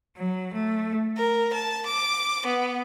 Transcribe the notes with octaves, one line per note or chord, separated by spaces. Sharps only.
F#3
A3
A#4
A5
D6
B3